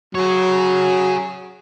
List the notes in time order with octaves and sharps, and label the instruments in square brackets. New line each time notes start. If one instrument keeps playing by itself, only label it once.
[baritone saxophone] F#3 [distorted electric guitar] G#4 C#5